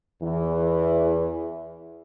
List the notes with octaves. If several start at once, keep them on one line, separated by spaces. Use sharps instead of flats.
E2 E3